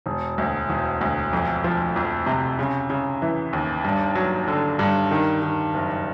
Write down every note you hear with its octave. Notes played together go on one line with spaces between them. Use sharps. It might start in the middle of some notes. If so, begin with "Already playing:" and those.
E1
D2
E1
D2
F2
F3
F2
C3
C#3
C#3
E3
D#2
G2
F#3
D3
G2
D#3
D#3
F#1